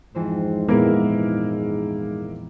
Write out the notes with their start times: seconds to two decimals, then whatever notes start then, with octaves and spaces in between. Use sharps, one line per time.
0.15 F2 G#2 E3 C5
0.69 A#2 G#3 A#3 B3 E4 A#4